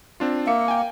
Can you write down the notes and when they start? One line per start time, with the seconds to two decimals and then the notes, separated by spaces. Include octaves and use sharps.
0.20 C4 D4 F4
0.47 A#3 E5 C#7
0.68 G5 G#5